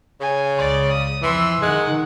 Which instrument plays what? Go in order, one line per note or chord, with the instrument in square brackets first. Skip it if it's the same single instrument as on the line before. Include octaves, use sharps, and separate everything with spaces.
[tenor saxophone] C#3 [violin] G#5
[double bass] C#2 [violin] D5
[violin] D#6
[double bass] F2 [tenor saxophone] E3 [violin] C6 E6
[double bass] D#3 [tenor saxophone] G#3 [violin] F#5 F#6